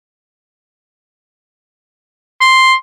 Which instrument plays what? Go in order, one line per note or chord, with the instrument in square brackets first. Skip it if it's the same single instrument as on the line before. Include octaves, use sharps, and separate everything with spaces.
[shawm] C6